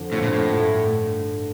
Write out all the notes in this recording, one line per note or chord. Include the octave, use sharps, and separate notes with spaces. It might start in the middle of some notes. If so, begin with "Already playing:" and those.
Already playing: F2 D3 F3
F2 A2 D3 F3
A#2
A2
G2 D3 A3 D4